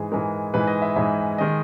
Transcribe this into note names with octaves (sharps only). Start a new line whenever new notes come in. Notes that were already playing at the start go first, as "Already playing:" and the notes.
Already playing: G#2 E3 G#3 G#4
G#2 E3 G#3 A#4
G#2 E3 G#3 B4
D#5
E5
G#2 E3 G#3 E5
D#3 G#3 D#5